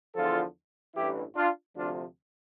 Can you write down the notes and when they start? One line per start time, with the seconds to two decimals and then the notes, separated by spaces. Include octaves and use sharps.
0.15 E2 D3 F3 F4 A4
0.95 A1 G2 E3 E4 G4
1.36 D4 F4
1.76 D2 C3 F3 D4 F4